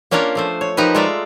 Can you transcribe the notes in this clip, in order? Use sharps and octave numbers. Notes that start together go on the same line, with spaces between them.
A#3 C#4 D4 F4 A#4 C#5
F3 A3 C5
C#5
F3 D#4 G4 A#4 B4
G#3 A3 F4 D5 E5 A#5